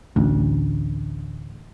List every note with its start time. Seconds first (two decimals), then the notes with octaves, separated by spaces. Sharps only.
0.16 A1 D2